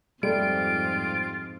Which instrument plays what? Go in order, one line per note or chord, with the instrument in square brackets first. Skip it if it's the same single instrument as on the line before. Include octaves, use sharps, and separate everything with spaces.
[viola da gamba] F2 G#2 [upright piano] G3 A3 [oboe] F4 [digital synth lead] D7